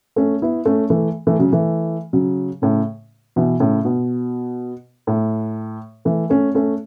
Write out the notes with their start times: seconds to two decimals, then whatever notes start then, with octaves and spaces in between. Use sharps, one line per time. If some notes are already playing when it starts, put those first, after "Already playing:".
0.16 A3 C#4
0.42 B3 E4
0.65 A3 C#4
0.90 E3 A3
1.27 E3 A3
1.39 C#3 F#3
1.52 E3 A3
2.13 C#3 F#3
2.62 A2 C#3
3.36 B2 E3
3.60 A2 C#3
3.85 B2
5.07 A2
6.05 E3 A3
6.30 A3 C#4
6.55 A3 C#4